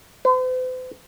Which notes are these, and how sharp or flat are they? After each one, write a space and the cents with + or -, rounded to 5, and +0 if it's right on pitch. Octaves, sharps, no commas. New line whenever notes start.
C5 -45